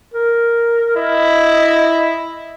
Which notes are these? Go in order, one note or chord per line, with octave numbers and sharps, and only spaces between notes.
A#4
E4 D#5